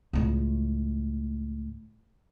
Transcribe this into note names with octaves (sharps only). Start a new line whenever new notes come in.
C#2 A2